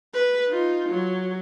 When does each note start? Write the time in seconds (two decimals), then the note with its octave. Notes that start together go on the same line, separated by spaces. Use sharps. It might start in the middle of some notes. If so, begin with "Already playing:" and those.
0.14 B4
0.48 D#4 F4
0.89 F#3